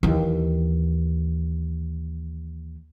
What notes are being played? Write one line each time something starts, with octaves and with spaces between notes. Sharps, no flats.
D#2 E3